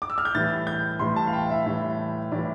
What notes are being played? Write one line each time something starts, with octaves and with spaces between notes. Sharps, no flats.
D6
E6
F6
G6
A2 E3 G3 A6
G6
A2 E3 G3 C6
A5
F5
G5
E5
A2 E3 G3
A2 E3 G3 D5